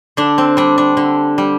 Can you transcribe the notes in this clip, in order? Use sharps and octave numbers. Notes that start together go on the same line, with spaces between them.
D3 D4
C4
G3 D4
D4
D3
G3